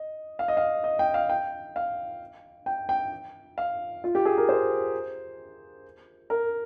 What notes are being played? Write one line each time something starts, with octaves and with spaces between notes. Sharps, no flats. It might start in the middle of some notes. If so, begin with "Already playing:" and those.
Already playing: D#5
F5
D#5
F5
D#5
G5
F5
G5
F5
G5
G5
F5
F4
G4
G#4
A#4
C5
A#4